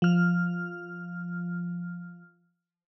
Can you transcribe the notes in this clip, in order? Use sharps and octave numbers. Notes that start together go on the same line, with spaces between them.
F3 F6